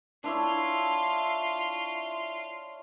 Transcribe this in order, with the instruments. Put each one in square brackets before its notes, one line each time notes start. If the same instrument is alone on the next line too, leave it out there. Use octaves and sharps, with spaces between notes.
[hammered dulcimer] D4 E4 C#5 [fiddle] F4